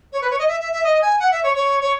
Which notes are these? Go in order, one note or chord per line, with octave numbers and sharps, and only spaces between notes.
C#5
B4
C#5
D#5
E5
E5
E5
D#5
G#5
F#5
E5
C#5
C#5
C#5